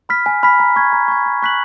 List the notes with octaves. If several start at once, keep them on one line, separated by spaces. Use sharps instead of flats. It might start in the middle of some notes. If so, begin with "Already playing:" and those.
B5 F6 B6
G#5
B5 F6 B6
A#5
C#6 G#6
A#5
C#6 G#6
A#5
C#6 F#6 B6 F#7